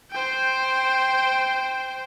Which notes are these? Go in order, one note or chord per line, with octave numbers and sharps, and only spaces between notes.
C5 G5